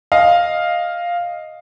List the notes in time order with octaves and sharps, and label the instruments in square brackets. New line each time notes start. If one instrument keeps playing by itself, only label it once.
[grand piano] D#5 F5